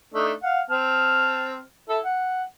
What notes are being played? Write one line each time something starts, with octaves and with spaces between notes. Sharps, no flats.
A3 D4 D#4
F5 F#5
C4 A5 F6
E4 A4
F#5